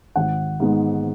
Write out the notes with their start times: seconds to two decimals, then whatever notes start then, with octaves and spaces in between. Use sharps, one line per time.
0.16 G#1 F#5
0.60 G#2 G#3 B3